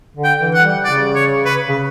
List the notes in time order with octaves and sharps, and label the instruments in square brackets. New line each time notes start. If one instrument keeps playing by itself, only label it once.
[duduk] D3
[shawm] G5
[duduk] E3
[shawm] F#5
[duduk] G3
[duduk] C#3 [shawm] D5
[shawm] C#5
B4
[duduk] C#3